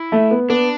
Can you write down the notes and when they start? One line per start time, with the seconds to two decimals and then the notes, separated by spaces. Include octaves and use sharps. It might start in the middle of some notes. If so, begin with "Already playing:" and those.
Already playing: E4
0.12 A3
0.31 B3
0.49 B3 D4